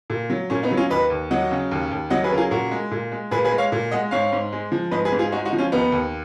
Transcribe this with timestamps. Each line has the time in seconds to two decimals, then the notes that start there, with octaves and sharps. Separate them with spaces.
0.10 A#2
0.30 F#3
0.50 A#2 C#4
0.63 B3 D#4
0.71 F#3
0.77 C#4 F4
0.90 D#2 B4 D#5
1.10 D#2
1.31 F#3 D#5 F#5
1.51 C#3
1.71 D#2
1.91 D#2
2.10 F#3 D#5 F#5
2.24 G#4 B4
2.31 C#3 A#4
2.37 F4 G#4
2.51 A#2 F#4 A#4
2.71 G#3
2.91 A#2
3.12 G#3
3.31 A#2 G#4 B4
3.45 G#4 B4
3.52 G#3
3.58 C#5 F5
3.72 A#2
3.91 G#3 D#5 F#5
4.11 G#2 C#5 F5
4.32 G#2
4.52 G#3
4.72 F3
4.91 G#2 B4 D#5
5.05 G#4 B4
5.12 G#2
5.19 F4 G#4
5.32 G#3 D#4 F#4
5.45 D#4 F#4
5.53 F3
5.58 C#4 F4
5.72 D#2 B3 D#4
5.92 D#2